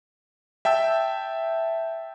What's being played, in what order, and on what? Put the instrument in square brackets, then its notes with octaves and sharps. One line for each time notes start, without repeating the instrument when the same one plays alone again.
[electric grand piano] E5 G5 A5 E6